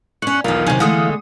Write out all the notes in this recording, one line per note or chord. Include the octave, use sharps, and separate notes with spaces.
G2 C#4 C#6 F#6
B1 E2 D#3 F4 A#4 F5
C3 D#3 F#3 G#5
D3 E3 G#3 A3 F5 F#5 D#6